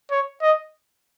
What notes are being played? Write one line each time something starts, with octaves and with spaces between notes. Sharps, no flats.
C#5
D#5